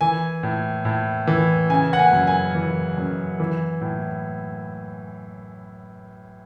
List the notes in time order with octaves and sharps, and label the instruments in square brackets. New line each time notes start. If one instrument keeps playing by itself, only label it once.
[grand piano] E3 G#5
A2
A2
E3
C#3 G#5
F#5
G#5
F#2
G#5
E3
F#2
E3
A2